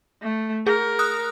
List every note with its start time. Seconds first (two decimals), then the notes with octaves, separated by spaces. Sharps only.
0.22 A3
0.67 G#4 A#4
0.99 D#6 F#6